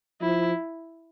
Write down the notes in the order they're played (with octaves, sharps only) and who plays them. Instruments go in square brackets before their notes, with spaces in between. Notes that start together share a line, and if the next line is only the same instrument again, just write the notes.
[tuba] F3 [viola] E4